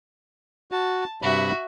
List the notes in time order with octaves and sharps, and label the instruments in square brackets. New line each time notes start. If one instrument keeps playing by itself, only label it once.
[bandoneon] F#4 [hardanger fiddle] A5
[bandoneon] G2 C3 B5 [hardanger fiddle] F#4 E5